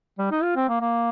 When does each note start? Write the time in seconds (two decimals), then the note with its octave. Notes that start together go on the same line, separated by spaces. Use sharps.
0.18 G3
0.31 D#4
0.43 F4
0.56 C4
0.69 A#3
0.81 A#3